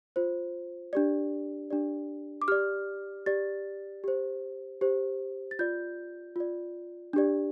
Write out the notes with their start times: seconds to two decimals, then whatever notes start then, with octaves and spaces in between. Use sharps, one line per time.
0.16 F4 C5
0.93 D4 G4 D5
1.71 D4 G4 D5
2.42 D6
2.48 G4 D5 F6
3.26 G4 D5 A6
4.04 G4 C5
4.81 G4 C5
5.51 A6
5.59 F4 D5 G6
6.36 F4 D5
7.13 D4 G4 D5